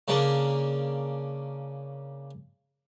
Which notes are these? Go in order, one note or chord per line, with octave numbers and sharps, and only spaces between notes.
C#3 A#3 C#4 D4